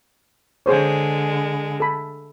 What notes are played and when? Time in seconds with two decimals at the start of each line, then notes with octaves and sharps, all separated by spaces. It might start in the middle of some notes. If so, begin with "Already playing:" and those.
0.66 D3 G#3 G#4 C5 C#5
1.80 A4 B5